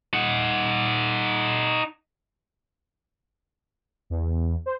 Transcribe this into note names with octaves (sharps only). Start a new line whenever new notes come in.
D#4 F#5
E2
C5